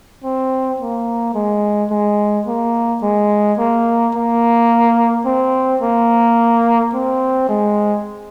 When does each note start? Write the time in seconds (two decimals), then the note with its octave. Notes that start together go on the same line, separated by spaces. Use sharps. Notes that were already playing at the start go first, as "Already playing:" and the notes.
0.24 C4
0.80 A#3
1.34 G#3
1.91 G#3
2.47 A#3
3.03 G#3
3.58 A#3
4.15 A#3
5.26 C4
5.82 A#3
6.94 C4
7.49 G#3